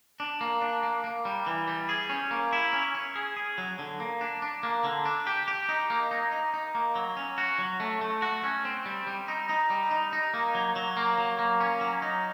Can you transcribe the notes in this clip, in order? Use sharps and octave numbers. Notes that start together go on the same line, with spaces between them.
D4
A#3
D4
A#3
A#3
G3
E3
G3
G#4
C#4
A#3
E4
C#4
C#4
G#4
G#4
F#3
D3
A#3
D4
D4
A#3
D3
D4
G4
G4
D#4
A#3
D#4
D#4
D#4
A#3
F#3
C#4
F#4
F#3
A3
A3
F#4
C#4
C4
G3
G3
D#4
D#4
G3
D#4
D#4
A#3
F#3
F#3
A#3
F#3
A#3
C#4
F#3
D#4